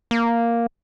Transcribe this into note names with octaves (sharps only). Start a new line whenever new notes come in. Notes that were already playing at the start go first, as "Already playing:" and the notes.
A#3